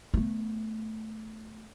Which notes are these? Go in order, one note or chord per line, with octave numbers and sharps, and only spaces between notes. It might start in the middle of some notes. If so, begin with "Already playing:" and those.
A3 B3